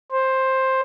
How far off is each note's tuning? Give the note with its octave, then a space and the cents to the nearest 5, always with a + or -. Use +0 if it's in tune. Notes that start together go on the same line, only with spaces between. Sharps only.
C5 +10